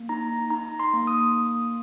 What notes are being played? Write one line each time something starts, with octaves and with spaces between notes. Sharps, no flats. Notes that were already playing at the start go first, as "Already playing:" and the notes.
Already playing: A#3
D#4 A#5
D#4 A#5
C6
A#3
D#6